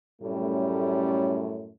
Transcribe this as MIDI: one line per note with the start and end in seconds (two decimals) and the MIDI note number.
0.20 1.70 42
0.20 1.70 45
0.20 1.70 55
0.20 1.70 57
0.20 1.70 61